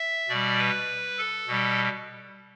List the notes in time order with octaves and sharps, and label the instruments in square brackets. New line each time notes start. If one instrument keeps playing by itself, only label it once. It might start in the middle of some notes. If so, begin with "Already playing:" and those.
Already playing: [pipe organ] E5
B2 G3 D5
B4
A4
B2 G3